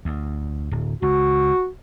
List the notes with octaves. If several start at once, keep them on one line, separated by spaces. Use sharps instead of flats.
D2
D1
C#2 F#4